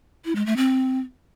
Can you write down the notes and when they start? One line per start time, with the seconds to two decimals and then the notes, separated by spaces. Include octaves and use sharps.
0.25 E4
0.35 G#3
0.46 A3
0.57 C4